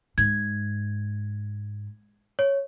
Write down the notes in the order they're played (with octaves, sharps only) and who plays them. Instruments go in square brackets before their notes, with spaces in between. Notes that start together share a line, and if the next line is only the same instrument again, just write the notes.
[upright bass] G#2 [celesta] G#6
[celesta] C#5